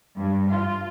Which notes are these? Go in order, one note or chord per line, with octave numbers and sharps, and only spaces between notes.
G2
F4